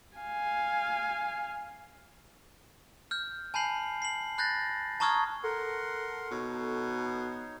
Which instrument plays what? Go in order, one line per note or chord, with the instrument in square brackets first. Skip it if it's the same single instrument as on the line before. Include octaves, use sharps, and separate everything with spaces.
[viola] F5 G#5
[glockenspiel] F6 G6
G#5 A5 B5 G6 C7 F#7
C7 F#7
B5 F#6 G6 A6 A#6
A5 A#5 C#6 D#6 F6 G#6
[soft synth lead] A4 [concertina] A#4 F#5 C6
[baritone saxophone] B2 [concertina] D#4 C#5